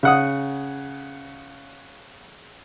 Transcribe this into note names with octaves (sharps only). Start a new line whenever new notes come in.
C#3 F#5 D#6